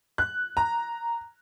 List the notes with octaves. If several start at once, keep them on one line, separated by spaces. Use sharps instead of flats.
F#6
A#5